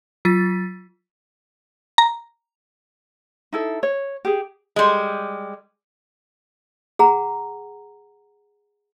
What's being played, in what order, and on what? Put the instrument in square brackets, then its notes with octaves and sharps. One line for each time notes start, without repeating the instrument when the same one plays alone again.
[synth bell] F#3 F4 A6 B6
[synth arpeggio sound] A#5
[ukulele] D#4 E4 A4
C#5
G4 G#4
[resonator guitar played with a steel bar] G3 G#3
[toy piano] G#4 F#5 A#5